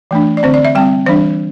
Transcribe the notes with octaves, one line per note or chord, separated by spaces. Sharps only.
E3 A3 D4
D5
D3 C4 C5
D5
E5
G3 C4 G5
E3 G3 D4 C5